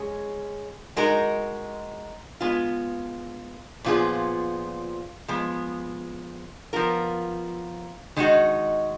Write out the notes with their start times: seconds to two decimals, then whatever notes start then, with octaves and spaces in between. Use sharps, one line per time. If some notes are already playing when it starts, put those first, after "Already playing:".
Already playing: G#3 C#4 G#4
0.96 G#3 D#4 F#4 A#4
2.41 G#3 B3 F4
3.84 A#2 F3 B3 F4 G#4
5.28 F3 G#3 B3
6.73 F3 B3 F4 A#4
8.16 D#3 G#3 D#4 F#4